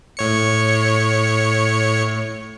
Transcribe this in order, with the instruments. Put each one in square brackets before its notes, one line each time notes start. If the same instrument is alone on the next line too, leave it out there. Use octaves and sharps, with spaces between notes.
[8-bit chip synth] A2 C#5 C#7